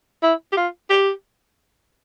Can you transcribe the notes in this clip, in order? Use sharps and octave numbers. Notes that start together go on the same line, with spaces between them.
E4
G4
F4
G4